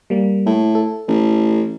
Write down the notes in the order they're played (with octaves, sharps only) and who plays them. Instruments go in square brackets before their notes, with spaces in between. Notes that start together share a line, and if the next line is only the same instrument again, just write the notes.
[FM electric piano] G3 A#3
[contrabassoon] A2
[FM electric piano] A4
[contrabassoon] A1